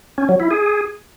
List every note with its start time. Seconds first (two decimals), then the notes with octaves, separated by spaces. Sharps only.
0.18 C#4
0.29 F#3
0.40 E4
0.51 G#4